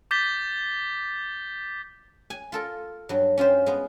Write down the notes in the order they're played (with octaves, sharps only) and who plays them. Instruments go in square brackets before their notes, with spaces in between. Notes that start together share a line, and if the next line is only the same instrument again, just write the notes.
[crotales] D6 G6 A6 B6 G7
[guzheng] G#5
F4 A4 A#4
G2 F#3
C#4 F4 G4 C5
G#3 B3